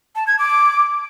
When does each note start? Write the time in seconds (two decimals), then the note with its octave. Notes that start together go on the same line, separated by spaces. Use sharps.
0.16 A5
0.27 G#6
0.39 D6